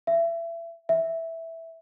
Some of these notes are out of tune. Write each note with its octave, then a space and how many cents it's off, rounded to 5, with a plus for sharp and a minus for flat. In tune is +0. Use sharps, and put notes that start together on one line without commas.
E5 +30
E5 -5